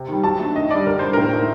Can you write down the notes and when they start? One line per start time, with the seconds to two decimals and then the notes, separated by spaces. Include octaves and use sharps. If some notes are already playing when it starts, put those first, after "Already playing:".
Already playing: C3
0.08 D#3 G3
0.23 F#3 A5
0.40 A3 D4
0.55 D#3 D#5
0.71 G3 D4 D5
0.86 D3 A#4
0.99 G3 D4 C5
1.13 A2 A#4
1.33 A3 D#4